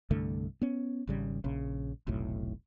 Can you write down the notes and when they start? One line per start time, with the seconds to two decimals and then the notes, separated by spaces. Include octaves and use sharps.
0.11 C2 G2 D3 A3
0.62 B3 C#4
1.07 G#1 C#3 G3
1.44 A#1 C#3
2.07 F1 B1 A2